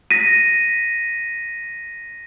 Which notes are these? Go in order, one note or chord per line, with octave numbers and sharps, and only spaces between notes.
A#6 B6 D#7